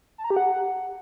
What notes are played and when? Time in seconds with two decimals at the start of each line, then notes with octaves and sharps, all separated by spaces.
0.18 A5
0.24 A#5
0.30 G4
0.37 F#5